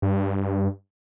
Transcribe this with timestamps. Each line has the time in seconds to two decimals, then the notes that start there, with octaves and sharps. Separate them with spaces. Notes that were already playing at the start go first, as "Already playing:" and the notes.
0.02 G2